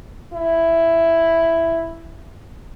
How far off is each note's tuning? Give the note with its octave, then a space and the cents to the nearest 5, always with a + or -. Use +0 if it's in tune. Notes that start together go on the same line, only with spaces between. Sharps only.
E4 +5